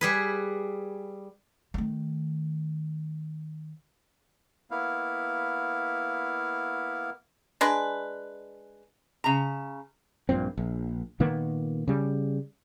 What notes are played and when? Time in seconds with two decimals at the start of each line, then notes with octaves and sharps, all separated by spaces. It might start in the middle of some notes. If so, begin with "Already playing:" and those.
0.01 G3 G#4 B4
1.74 D#3 A3
4.71 A#3 B3 E4 F5
7.61 G#3 D4 B4
9.24 C#3 A#5
10.29 A#1 G2 A#2 C4
10.58 A#1
11.20 A#2 D#3 A#3 B3
11.88 C#3 G3